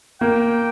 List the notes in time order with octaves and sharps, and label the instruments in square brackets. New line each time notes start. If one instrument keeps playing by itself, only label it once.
[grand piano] A#3 [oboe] G5